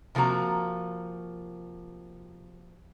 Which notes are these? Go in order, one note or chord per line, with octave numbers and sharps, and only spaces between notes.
C3 F3 A#3 F#4 A#5